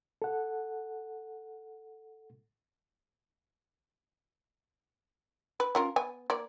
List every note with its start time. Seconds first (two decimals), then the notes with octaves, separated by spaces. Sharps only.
0.22 A4 F#5
5.60 B4
5.75 C#4 F4 A#4
5.96 B3 G#5
6.30 A#3 D5